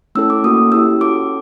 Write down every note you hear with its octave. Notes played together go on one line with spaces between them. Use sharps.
A3 C#4 E4 A4 E6
D6
A#3 C#4 F#4 A4 D#6
C#4 E4 G4 E6
C#4 F#4 A4 D6